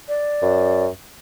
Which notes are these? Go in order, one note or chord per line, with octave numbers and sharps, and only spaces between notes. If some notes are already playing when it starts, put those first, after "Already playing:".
D5
F#2